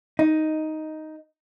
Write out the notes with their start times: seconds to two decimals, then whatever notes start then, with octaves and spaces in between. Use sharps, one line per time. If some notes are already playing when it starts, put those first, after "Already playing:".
0.19 D#4